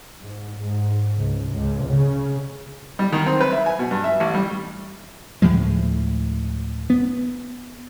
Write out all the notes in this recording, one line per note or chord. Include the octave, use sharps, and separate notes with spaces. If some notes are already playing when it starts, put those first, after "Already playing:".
G#2
G#2
C#2
C#2
C#3
G3
D#3
C4
B4
E5
G#5
B2
G2
E5
A1
G3
D2 A2 F3 G#3
B3